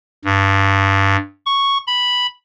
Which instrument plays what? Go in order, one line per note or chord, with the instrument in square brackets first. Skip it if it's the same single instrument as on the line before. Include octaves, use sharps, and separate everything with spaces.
[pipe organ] G2
C#6
B5